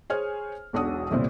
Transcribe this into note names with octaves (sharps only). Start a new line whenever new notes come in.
G#4 C5 C#5 G#5 F6
E1 B1 D4 F#4 D#6
G1 C2 A#2 G3 C4 C5